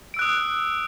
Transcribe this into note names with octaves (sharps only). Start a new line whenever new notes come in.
D#6 E6 F#6 D7